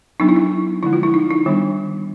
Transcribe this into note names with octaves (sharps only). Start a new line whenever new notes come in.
F#3 B3 D4 D#4
E4
D#4
D3 F3 G#3 E4
F4
E4
D#4
D#4
D#3 G3 B3 D4